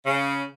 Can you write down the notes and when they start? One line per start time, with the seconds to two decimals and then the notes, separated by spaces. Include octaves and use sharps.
0.06 C#3